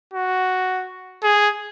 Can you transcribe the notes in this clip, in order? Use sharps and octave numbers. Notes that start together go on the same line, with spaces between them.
F#4
G#4